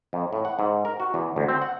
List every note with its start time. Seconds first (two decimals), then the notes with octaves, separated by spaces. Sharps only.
0.13 F2
0.33 A2
0.45 F#5
0.59 G#2
0.85 A#4
1.00 F#4
1.14 E2
1.36 D2
1.49 C4
1.62 F#5